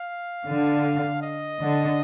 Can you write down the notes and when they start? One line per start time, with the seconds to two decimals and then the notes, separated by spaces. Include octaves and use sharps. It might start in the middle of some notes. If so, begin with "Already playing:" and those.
Already playing: F5
0.45 D3
1.22 D#5
1.60 D3